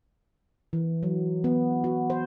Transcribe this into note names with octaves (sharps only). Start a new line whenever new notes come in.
E3
F#3
B3
F#4
C5